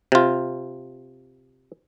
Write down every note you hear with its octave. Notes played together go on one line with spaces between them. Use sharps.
C3 F4